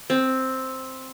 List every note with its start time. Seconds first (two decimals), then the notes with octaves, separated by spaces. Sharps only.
0.10 C4